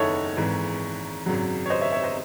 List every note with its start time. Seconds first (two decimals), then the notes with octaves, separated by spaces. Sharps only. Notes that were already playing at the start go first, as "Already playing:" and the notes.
Already playing: F#1 E2 D#3 D#4 E4 A4 C#5
0.37 G#1 G#2 E3
1.26 G#1 F#2 C#3 F#3
1.66 C#5
1.70 C5 D#5
1.81 C#5 E5
1.92 C#5 E5
2.03 C5 D#5